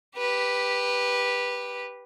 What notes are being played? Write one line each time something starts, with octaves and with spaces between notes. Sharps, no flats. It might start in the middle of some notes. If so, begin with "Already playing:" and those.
G4 B4